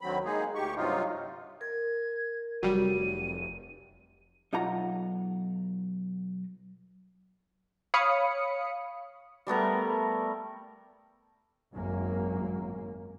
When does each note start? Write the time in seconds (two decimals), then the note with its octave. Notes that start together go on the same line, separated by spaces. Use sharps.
0.01 D2 D3 D#3 F#3 C4 B5
0.25 G#3 A#3 D#4 G#4
0.55 D2 G4 C#6
0.76 G2 C3 F#3 D#4 F4
1.61 A#4 G#6
2.63 F1 F#3 G3 D#7
4.53 B1 D#4 F4 F#5 A#5
7.94 C#5 F5 B5 D#6 C#7
9.47 G3 A3 B3 A#4
11.73 G#1 F#2 A#3